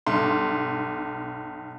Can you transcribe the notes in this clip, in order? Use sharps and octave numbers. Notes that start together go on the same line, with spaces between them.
B1 G2 C6